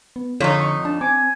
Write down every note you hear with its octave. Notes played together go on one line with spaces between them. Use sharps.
B3
F2 D3 D#4 A4 C#5 D5
C#6
D4 A5
C4 G#5 D6